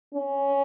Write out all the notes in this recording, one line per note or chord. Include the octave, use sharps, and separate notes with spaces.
C#4